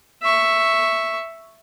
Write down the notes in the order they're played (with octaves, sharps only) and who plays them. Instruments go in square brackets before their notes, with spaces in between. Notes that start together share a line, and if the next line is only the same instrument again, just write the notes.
[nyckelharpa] E5 C#6